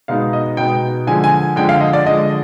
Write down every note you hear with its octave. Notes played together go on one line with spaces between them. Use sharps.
B2 G#3 B3 D#4 F5
D#5
B2 G#3 B3 D#4 G5
D3 F3 G#3 G#5
G#5
D3 F3 G#3 G5
F5
D#5
D5
D3 F3 G#3 D#5